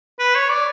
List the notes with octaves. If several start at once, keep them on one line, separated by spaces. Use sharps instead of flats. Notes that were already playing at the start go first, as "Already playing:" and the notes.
B4
C#5
D5